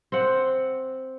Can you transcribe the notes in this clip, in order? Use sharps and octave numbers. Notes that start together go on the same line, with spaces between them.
C4 F#5